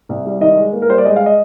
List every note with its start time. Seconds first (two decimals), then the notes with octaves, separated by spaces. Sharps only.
0.09 C2
0.26 G3
0.41 D#3 D#5
0.57 G#3
0.73 A#3
0.82 A#4
0.89 G3 C5
0.98 D5
1.05 G#3 D#5
1.16 F5
1.26 D#5